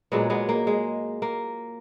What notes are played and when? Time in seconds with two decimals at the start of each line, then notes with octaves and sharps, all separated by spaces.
0.12 A#2 F#3 G#3 B3
0.30 G#3 B3
0.49 A#3
0.67 G#3
1.22 A#3